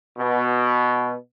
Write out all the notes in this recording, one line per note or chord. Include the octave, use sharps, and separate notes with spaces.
B2